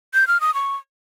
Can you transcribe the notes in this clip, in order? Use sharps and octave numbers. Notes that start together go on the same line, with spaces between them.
G6
F6
D#6
C#6